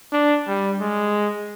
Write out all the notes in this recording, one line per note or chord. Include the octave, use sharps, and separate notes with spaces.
D4
G3
G#3